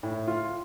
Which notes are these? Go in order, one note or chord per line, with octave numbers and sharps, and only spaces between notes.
A2
F4